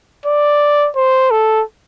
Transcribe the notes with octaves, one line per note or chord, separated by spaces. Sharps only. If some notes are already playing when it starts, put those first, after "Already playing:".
D5
C5
A4